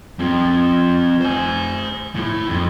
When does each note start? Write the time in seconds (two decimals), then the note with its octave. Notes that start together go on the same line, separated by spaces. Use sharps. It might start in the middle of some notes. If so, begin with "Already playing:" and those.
0.19 F3 C4
1.21 C5 G#5
2.15 A2 E4
2.49 F2